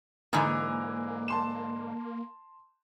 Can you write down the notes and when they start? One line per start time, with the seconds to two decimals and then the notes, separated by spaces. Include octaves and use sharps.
0.33 G#2 D3 E3 A#3 G#5 A#5
1.28 A5 C6 E7